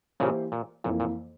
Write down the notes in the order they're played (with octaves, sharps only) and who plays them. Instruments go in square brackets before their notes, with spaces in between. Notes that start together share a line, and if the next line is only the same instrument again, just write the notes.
[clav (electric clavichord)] A#2 C#3 [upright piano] E3 A#3 E4 G4 C5
[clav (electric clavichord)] A#2
[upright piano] F2 E3 A#3 [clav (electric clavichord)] A#2
[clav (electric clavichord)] A#2